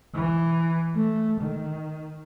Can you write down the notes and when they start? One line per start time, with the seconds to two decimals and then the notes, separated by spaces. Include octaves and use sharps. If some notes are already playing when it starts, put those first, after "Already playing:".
0.15 E3
0.96 A3
1.41 D#3